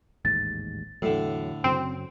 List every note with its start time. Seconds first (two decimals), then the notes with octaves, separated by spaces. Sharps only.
0.25 A1 D#2 G#2 A6
1.02 E2 A2 D3 F#3
1.64 F#2 C#3 F#3 C4